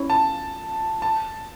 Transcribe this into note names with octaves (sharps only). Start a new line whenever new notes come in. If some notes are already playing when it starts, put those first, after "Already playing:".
Already playing: C#4 E4
A5
A5